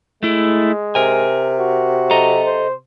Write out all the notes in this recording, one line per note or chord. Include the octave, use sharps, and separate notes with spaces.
G#3 A3 E4
C3 A#4 G#5
F#4
A4 D#5 A#5
C5